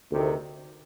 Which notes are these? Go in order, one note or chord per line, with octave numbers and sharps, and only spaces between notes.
D2 C3 D#3